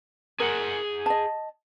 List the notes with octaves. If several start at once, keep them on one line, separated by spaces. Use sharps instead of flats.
G#4 A#4 F#5
D#5 A5